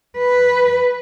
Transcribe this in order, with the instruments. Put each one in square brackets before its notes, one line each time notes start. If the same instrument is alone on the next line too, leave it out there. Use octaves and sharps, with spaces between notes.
[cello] B4